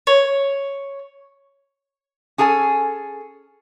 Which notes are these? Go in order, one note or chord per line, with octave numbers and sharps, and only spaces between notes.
C#5
C#4 G#4 A4 G5 G#5